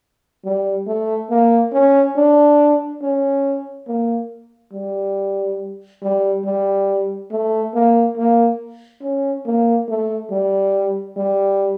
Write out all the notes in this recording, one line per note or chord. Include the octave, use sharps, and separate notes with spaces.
G3
A3
A#3
C#4
D4
C#4
A#3
G3
G3
G3
A3
A#3
A#3
C#4
A#3
A3
G3
G3